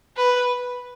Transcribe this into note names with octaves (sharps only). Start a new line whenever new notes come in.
B4